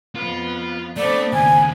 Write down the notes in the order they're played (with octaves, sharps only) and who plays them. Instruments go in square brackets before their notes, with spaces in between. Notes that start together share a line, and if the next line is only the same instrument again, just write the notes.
[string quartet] F2 B3 [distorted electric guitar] F4
[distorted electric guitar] A3 [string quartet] B3 C4 D4 [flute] D5
[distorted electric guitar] D#2 C#3 [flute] G#5